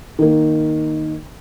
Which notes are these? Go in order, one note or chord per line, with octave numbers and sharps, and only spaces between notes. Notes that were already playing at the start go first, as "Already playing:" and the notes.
D#3 A#3